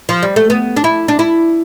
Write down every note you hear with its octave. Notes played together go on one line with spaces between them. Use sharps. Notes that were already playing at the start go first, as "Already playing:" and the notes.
F3
G3
A3
B3
D4
E4
D4
E4